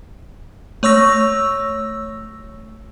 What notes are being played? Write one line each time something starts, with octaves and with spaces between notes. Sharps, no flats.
A3 C#5 C#6 E6 A#6